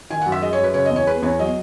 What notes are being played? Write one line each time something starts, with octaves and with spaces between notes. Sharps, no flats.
D#3 G#5
F#2 F#5
E5
G#3 D#5
C#5
F#2
B4
C#3 C#5
D#5
E2
C#5
G#3 B4
E2 C#5
F#3 D#5